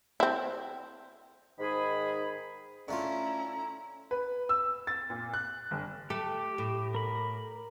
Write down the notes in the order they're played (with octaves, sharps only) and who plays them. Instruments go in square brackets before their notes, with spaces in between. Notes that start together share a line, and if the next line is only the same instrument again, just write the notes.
[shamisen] C4 E4
[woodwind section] G#2 D#3 G#4 B5
[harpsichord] D3 A3 F4 [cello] C#4 E4 [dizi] A#5
[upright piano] B4
E6
A6
A#2
F#6
G1
[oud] A3 A4 [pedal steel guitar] G4
[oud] A2
[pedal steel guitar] A#4 B5